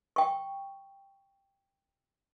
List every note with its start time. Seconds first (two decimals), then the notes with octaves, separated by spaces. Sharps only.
0.16 G5 C#6